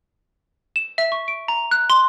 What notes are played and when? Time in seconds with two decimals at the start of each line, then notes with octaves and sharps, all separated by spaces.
0.76 E7
0.98 E5
1.12 C#6
1.28 D7
1.48 A#5
1.71 F#6
1.90 C6